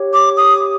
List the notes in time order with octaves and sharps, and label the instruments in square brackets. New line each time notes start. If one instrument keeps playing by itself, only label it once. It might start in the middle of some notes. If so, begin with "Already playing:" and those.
Already playing: [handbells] G4 C#5
[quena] D6
D#6